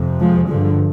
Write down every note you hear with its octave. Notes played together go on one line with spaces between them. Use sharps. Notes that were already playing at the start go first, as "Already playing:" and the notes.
Already playing: F2 C3
F3 G#3
G2 D3 F3